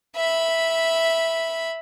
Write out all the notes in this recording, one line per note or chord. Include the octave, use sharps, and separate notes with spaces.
E5 B5